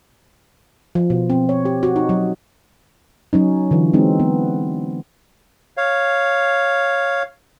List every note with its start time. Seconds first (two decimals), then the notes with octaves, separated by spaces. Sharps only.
0.95 F3
1.10 B2
1.30 C4
1.49 C#5
1.65 G4
1.83 F#4
1.96 D#4
2.09 F#3
3.33 F#3 C#4 D#4
3.71 D3 E3 F4
3.93 G#3 C4 D#4 F#4
4.20 B3
5.77 C#5 F5